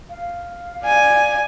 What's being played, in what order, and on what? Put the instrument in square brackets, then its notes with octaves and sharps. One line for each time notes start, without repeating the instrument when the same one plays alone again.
[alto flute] F5
[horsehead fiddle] D5 G#5